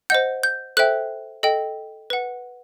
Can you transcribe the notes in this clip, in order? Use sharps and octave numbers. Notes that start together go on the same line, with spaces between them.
C5 D#5 F#5 G6
G6
A4 C5 E5 G5 F#6
A4 D#5 G5
B4 F#5